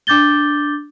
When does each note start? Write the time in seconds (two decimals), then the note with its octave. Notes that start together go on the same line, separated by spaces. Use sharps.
0.07 D4 D6 G6 A6 G7